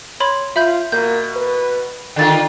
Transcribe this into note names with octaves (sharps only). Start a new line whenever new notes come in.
C#5 B5 C6
F4 E5 B5 G6
B2 A#3 G6
B4
D3 D#3 F4 A4 G5 A6